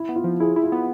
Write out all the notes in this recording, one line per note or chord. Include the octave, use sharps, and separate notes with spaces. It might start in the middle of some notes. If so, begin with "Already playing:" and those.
Already playing: E4
B3
F4
F3
E4 G#4
E4
F4
B3